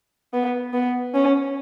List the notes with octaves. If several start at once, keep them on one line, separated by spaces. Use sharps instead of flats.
B3
B3
C#4